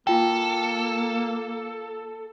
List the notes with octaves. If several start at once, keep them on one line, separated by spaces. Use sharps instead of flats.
A#3 F4 A4 G5